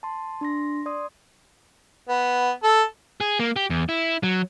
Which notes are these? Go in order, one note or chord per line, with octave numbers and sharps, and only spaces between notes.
A5 C6
D4 C6 A#6
D5 C6 D#6
B3
A4
G#4
A#3
G4
E2
E4
F#3